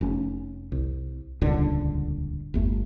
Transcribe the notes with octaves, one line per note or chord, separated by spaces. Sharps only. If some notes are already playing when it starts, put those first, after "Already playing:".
F1 C#4
C2
D#1 C#2 G#2 D3
G1 E2 A3